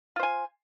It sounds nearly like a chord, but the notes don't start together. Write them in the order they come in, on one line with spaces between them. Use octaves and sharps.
F4 C5 G#5